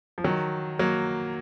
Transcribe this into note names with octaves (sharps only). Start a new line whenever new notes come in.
F3
D#3 F#3
F#3 A#3